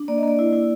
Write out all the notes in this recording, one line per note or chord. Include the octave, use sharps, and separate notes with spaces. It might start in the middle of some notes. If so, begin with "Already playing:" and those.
Already playing: D4
A#3 D5
D#5
A#3 D5
E4
E4